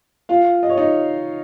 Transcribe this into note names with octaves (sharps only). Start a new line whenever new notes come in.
F4 F5
D#5
C#5
D#4 D#5